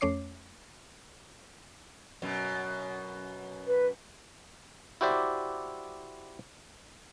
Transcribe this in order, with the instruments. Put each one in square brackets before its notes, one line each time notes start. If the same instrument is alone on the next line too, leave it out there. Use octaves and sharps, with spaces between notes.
[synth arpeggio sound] F2 A3 C#4 C#5 D6 C7
[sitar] F#2 B2
[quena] B4
[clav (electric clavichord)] E4 F#4 G4 C5 D5 E5